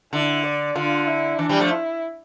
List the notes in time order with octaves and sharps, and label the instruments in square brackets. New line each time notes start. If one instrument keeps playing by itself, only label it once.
[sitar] D3 [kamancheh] E4
[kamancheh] D5
[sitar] D3 [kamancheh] F4
[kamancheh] E4
[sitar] E3 [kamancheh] D4
[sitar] E3 G3
F3 A3
[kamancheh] E4